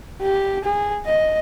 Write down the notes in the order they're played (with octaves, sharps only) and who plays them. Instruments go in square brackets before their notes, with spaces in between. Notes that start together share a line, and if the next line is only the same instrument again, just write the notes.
[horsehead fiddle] G4
G#4
D#5